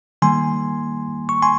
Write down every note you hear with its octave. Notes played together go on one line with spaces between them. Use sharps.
D#3 G3 A#3 G#5 C6
C#6
G#5 C6